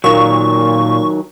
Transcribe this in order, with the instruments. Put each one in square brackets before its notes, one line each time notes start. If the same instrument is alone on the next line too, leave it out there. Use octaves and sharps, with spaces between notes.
[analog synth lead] A#2 [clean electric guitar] D#3 F#3 [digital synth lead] C#6